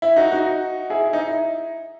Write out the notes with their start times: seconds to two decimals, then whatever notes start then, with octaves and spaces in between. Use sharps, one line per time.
0.02 E4
0.16 D#4 F#4
0.31 D#4 F#4
0.90 E4 G#4
1.06 E4
1.13 D#4
1.20 E4